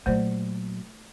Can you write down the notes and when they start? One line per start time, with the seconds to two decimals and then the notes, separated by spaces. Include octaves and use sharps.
0.06 A#2 F#3 A3 C5 D5